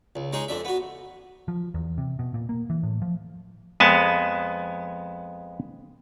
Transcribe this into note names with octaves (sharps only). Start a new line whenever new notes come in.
C#2
G#3 D#4 G#4 C#5
F2 D4 E5
B3 F#4
F3
E2
C3
B2
A#2
A#3
E3
A2
F3
F2 G#3 B3 G#5 A5